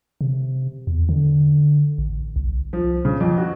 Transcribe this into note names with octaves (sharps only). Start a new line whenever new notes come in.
C3
E2
D3
A1
C2
F3
C#3
F2
F#4